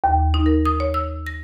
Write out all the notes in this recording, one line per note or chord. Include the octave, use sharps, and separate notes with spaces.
D#2
D#4
A#4
D#6
C#5
E6
A#6